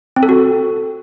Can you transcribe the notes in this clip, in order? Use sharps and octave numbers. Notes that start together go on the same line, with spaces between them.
C4
A4
F#4